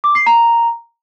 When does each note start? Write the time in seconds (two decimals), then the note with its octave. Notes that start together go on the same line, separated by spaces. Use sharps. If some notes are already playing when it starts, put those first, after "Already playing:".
0.04 D6
0.15 C7
0.26 A#5